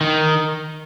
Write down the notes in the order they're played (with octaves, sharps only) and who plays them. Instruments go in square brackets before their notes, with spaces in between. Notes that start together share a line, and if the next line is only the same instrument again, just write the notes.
[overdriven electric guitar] D#3